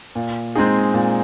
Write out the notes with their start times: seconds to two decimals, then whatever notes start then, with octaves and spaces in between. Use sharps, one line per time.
0.15 A#2
0.55 G#3 C4 D#4 G#4
0.94 A#2